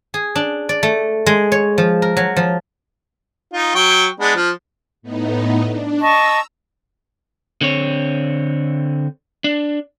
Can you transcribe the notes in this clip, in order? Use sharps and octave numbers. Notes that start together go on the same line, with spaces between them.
G#4
D4
D5
A3
G#3
C#5
F3
A#4
F#3
F3
D#4 F4
F#3 G5 C#6
G#3 B3 D4
F3
A2 B3 D#4
D4
D#5 A5 A#5 C#6 E6
D3 C4 C#5
D4